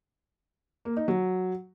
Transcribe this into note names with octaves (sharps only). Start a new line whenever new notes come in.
A#3
D#4
F#3